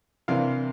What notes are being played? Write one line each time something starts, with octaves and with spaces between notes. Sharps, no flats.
C3 E3 A#3 D4 F5